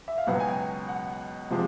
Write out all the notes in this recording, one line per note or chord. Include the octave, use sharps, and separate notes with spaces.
E5
F5
C#2 B2 F#3 B3 F#5
G#5
G5
F#5
C3 F3 G#3